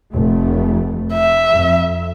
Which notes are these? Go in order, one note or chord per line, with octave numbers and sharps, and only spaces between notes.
F1 A3
E5
F2